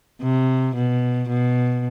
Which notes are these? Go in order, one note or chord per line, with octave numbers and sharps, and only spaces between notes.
C3
B2
B2